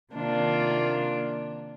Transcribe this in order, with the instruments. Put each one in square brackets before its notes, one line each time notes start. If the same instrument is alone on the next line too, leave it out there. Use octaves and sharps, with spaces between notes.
[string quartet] C3 D#3 A#3 D4 F4